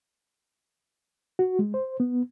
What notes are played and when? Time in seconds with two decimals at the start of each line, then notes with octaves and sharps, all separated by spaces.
1.39 F#4
1.59 G#3
1.74 C5
2.00 B3